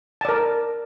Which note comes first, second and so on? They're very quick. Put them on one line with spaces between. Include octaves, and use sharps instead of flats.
A5 D5 A#4